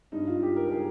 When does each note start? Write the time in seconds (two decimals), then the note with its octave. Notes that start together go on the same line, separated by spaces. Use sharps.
0.12 G2 D#4
0.27 F4
0.42 G2 G4
0.56 A#4
0.68 A#4
0.72 G#4